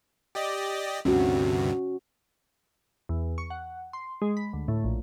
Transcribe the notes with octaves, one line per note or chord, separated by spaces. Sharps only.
G4 D5 D#5
D2 G2 C3 C#4 F#4
E2
C#6
F#5
C6
G#3
B5
D2
A2
A#1